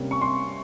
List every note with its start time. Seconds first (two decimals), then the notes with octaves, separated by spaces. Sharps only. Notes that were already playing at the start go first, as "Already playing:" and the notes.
Already playing: C3 G3 A#3 C#4
0.11 C#6
0.22 C6